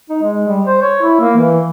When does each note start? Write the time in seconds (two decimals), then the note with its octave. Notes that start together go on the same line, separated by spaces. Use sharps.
0.10 D#4
0.23 G#3
0.48 G3
0.66 C5
0.82 C#5
1.03 E4
1.21 A#3
1.37 E3